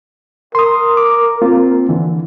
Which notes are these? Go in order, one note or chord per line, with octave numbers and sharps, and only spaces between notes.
A#4 C6 D#6
D6
A#3 C4 F4
D3 E3